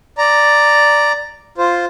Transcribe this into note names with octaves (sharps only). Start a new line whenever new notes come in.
D5 A#5
F4 C5